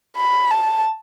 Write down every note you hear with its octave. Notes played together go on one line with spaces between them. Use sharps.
B5
A5